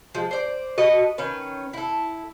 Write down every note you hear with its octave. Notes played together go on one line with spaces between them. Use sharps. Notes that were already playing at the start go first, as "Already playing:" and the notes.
F3 G#3
C5 D5
F#4 A4 B4 D#5
D#3 C#4 B4
E4 A4